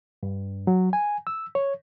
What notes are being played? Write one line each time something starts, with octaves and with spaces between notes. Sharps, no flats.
G2
F#3
G#5
E6
C#5